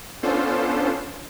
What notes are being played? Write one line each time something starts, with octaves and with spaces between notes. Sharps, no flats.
B3 C#4 D4 F4 A4 C5